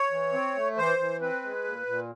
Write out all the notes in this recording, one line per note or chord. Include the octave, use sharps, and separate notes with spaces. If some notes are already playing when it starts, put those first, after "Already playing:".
Already playing: C#5
E3
C4
A3
E3 C5
E3
C4 B4
G#3
A#2
A#2